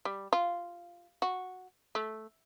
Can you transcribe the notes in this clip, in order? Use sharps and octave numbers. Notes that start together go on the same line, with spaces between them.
G3
F4
F#4
A3